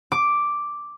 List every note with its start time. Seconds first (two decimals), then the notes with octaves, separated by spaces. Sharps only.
0.12 D6